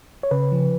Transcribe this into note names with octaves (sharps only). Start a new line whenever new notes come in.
C#5
C#3 B4
F3